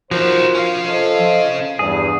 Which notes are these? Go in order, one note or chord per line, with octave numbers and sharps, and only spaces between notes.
F3 D#4 F#4 A#4 C5
C#4 F5
A4 C5 D#5
E2 G2 G#4